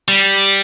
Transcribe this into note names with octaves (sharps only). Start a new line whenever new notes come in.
G3